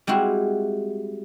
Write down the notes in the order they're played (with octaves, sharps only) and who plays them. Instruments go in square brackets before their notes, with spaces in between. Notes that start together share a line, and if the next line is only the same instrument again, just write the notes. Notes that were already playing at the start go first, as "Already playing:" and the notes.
[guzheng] G3 G#3 C4 E4 F#4